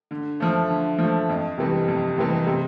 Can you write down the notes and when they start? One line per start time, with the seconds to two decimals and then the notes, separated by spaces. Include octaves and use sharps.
0.11 D3
0.40 F3 A3
0.70 D3
0.99 F3 A3
1.29 F2
1.58 C3 E3 G3
1.88 F2
2.18 C3 E3 G3
2.47 C3